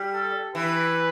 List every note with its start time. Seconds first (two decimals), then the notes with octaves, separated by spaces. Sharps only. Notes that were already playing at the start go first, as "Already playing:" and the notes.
Already playing: G3
0.14 A4
0.55 E3 B4